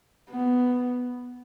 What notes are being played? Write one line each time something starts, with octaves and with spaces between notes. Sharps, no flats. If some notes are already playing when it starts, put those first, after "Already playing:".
B3